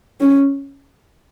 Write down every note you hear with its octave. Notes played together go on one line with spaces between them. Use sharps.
C#4